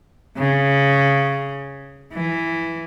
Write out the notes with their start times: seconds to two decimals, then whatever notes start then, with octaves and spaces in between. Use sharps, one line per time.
0.38 C#3
2.13 E3